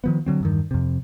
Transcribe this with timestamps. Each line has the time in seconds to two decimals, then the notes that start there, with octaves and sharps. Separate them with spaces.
0.04 D#3 F3 B3
0.26 D3 F#3 C4
0.41 E2 G2 D#3
0.71 F2 C3